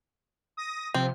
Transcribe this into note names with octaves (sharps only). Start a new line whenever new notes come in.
D#6 A#6
C3 F3 C4